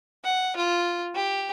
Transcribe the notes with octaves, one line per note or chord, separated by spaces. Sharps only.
F#5
F4
G4